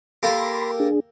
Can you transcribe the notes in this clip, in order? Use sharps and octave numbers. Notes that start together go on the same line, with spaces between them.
A#3 G4 A4 B5 C6
D4 G#4